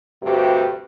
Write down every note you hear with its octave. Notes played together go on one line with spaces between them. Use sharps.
D2 G2 C3 F#4 G4